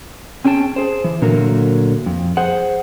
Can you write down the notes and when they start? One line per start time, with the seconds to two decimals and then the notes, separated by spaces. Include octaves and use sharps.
0.45 C4 C#4 G#4 G5 A5
0.76 G#4 C5
1.04 E3
1.22 A#2 D3 F#3 A3 A#3 A#4
2.06 F2
2.37 G#4 C5 F#5